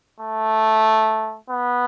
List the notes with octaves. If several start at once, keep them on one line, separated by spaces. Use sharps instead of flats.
A3
B3